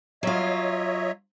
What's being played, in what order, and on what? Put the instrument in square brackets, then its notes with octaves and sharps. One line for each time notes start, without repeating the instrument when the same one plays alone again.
[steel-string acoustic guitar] F#3 F4 [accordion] C#5 D#5 E5